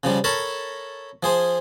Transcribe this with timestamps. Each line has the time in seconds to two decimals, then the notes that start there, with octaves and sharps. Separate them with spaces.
0.03 C#3 F3 G3
0.24 A4 A#4 C#5 A5 B5
1.23 F3 G#4 C5